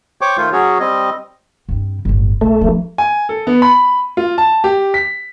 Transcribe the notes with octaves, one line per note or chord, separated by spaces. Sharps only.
C5 C#5 G5 C#6 D6
D#3 A3 F4 C5
F#3 C#4 F#4 G#4 C#5
G3 C4 D#5
G2 C4
G1 A2
B1 A3
F3 D4
G#5
A4
B3
B5
F4
A5
G4
B6